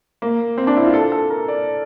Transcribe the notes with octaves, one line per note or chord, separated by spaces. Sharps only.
A#3
C4
D4
E4
F4
A4
A4
A#4
D5